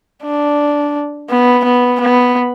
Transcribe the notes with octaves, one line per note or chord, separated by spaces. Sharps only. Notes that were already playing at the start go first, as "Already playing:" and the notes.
D4
B3
B3
B3